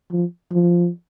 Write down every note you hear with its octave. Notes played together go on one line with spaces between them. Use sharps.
F3
F3